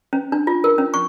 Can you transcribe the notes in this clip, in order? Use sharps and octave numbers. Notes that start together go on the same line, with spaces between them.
C#4
D4
F4
A#4
C#4
C#6